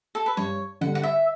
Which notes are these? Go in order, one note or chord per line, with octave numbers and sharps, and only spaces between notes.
A4
B4
G2 C#5
D3 G3 F#5
F#5
E5